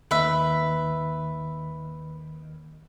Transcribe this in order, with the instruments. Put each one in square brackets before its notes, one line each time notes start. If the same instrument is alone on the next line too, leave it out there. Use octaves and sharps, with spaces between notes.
[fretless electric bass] D#2 [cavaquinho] B4 E5